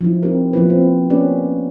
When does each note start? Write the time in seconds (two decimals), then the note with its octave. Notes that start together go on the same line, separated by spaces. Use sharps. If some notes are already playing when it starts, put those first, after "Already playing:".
0.01 F3 D#4 E4
0.23 C4 D#4 G4 A#4
0.53 F3 A#3 B3 E4 F4 B4
0.70 C4
1.10 A#3 B3 C#4 G4 B4 D5